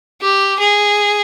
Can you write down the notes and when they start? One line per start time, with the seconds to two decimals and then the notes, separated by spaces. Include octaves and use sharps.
0.22 G4
0.59 G#4